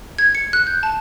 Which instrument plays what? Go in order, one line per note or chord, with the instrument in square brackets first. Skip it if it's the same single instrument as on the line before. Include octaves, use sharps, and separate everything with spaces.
[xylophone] G#6
C#7
F#6
G6
A5